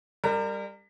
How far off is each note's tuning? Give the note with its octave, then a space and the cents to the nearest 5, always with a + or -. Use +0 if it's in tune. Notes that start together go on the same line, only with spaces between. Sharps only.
G3 +25 A#4 -30